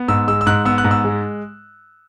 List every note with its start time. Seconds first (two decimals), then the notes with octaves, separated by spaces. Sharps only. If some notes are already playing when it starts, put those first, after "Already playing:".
Already playing: B3
0.08 G#2 E6
0.28 G#3 E6
0.41 E6
0.46 G#2 F#6
0.65 B3 E6
0.78 F#6
0.84 G#2
0.91 E6
1.04 G#3